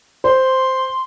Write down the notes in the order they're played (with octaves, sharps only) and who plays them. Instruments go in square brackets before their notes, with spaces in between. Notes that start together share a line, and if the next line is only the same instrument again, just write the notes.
[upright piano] C5 [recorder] C6